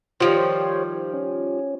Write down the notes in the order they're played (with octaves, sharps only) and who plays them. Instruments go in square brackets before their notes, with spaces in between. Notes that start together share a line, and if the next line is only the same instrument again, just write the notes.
[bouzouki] D#3 F3 G3 [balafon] F4 [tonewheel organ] G4 C5 C#5
[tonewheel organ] C#4